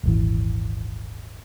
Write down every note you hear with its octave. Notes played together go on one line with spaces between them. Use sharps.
D#1 G#1 E3